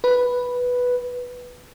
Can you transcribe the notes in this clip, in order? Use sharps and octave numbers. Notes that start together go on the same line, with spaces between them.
B4